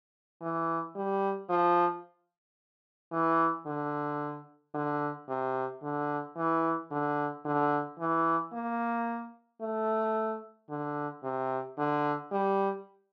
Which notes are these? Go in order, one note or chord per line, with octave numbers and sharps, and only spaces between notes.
E3
G3
F3
E3
D3
D3
C3
D3
E3
D3
D3
E3
A#3
A3
D3
C3
D3
G3